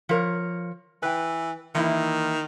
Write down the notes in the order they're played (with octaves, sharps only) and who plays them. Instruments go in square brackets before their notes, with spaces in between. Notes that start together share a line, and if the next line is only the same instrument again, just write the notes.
[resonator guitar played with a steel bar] F3 A#4 C#5
[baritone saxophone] E3 [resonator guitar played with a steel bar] B4 G5
[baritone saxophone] D#3 [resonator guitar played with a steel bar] E3 A#3 E4